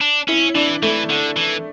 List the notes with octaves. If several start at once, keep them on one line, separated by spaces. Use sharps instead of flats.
D4
C#4 E4
E3 D4
E3 A3
D3
E3